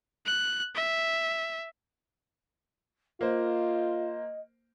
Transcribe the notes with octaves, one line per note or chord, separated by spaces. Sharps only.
F#6
E5
A#3 F4 C5 D#5